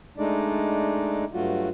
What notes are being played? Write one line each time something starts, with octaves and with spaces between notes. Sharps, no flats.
G#3 A3 D4 D#4 D5
G2 F#3 A3 F4 F#4